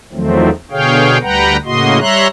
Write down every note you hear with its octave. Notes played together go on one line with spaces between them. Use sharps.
E2 D#3 F3 F#3 A3 C4
B2 D3 G#4 C#5 F5 G5
D2 G3 B4 F#5 G5 A#5
A2 C#3 A#3 F#4 D#5 C6
G3 C#5 E5 A#5 C6 F#6